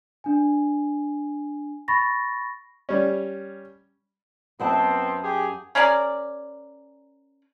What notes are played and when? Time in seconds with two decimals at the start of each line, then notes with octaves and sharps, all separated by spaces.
0.24 D4 G#5
1.88 B5 C#6 A6 A#6
2.89 G3 C#4
4.60 F#2 B3 C4 F#5 A5
5.24 G4 G#4
5.75 C#4 G#4 A#4 D5